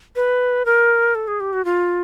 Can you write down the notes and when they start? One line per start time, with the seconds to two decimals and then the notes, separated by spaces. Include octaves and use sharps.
0.16 B4
0.65 A#4
1.15 A4
1.28 G#4
1.40 G4
1.53 F#4
1.65 F4